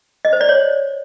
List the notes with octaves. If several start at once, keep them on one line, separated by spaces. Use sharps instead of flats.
D#5
C5
D5
C#5